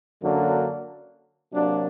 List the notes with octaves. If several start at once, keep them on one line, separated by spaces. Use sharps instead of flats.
F#2 D3 F#3 A#3 D4
C3 F#3 A#3 D4